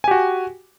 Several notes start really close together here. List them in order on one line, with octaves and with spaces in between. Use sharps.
G#5 G4 F#4